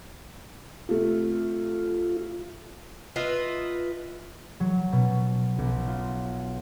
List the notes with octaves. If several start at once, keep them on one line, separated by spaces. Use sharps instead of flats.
C3 A3 F4
F4 B4 D#5 E5
F#3
B2
B1
F4